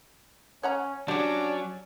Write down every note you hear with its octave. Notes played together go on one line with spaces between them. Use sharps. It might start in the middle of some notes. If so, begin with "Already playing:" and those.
C#4 C#5 F#5 A#5
F#3 C#4 D4 G4 G#4